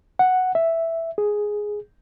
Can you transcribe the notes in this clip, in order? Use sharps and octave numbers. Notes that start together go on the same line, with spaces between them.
F#5
E5
G#4